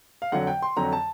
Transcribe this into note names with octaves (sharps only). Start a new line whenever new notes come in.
F5
F2 D3 F#3 F#5
G5
C6
F2 D3 F#3 A#5
A5